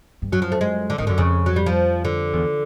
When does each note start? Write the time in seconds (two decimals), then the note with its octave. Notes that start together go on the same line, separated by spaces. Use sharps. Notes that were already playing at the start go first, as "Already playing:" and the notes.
0.22 G2
0.32 F#2 F#3
0.42 F3
0.52 A3
0.61 G#3
0.90 D3
0.98 G#2 D#3
1.07 F#2 D3
1.18 F2 C#3
1.46 F#3
1.56 G3
1.66 F3
2.05 D3
2.33 E2